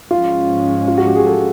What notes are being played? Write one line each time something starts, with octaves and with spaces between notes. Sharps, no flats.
G#2 F3 G#3 C#4 F4
F4
F#4
G4
G#4
A4